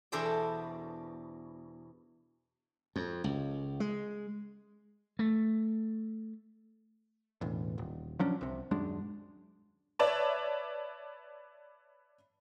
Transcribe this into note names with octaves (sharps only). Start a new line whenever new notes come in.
E2 B2 D4 A4 C5 D5
F2
C#2
G#3
A3
E1 A1
D#1
F3 F#3 C#4 D4
C2 C3
D#1 F#2 G#3 D4
B4 C#5 D5 E5 A5